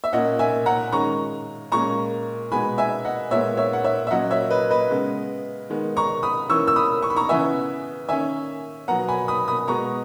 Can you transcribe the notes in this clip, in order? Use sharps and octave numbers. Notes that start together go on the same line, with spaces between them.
E5
A#2 A#3 C#4 D#5 F#5
E5 G#5
F#5 A#5
D#3 G#3 C#4 A#5 C#6
A#2 G#3 C#4 A#5 C#6
B2 G#3 B3 G#5 B5
E5 G#5
D#5 F#5
A#2 G#3 B3 C#5 E5
C#5 E5
F#5
C#5 E5
E5
A#2 F#3 C#4 D#5 F#5
C#5 E5
B4 D#5
B4 D#5
C#3 G#3 B3
D#3 G#3 B3
A#5 C#6
B5 D#6
E3 A#3 C#4 C#6 E6
E6
B5 D#6
C#6
B5
A#5 C#6
C#3 E3 B3 E5 G#5
D#3 A#3 C#4 E5 G#5
B2 F#3 B3 F#5 A#5
G#5 B5
B5 D#6
B5 D#6
B2 G#3 B3 A#5 C#6